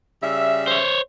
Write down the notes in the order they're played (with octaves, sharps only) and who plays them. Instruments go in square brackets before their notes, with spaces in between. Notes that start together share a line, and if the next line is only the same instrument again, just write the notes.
[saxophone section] C#3 G3 E5
[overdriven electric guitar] C5 C#5